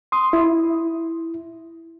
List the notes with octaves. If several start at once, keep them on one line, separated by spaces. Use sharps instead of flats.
C6 D#6
E4